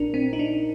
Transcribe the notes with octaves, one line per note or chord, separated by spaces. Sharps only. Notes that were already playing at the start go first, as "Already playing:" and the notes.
Already playing: A#1 A#2 D4 A#4
C4
D#4
D4